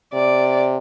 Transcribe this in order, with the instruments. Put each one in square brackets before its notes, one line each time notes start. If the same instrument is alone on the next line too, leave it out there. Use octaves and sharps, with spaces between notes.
[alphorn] C3 [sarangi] D5